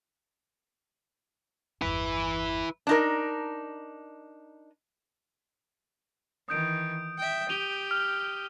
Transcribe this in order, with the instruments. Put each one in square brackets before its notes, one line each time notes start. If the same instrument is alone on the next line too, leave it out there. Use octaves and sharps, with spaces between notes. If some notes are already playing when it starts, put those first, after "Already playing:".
[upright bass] G1 E2 [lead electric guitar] E4 B4
[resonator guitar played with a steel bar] D4 D#4 A#4
[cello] D#3 E3 [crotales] D#6 G6 D7
[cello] E5 G5
[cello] G4 [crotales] D#7 F7 G7
[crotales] F6 F7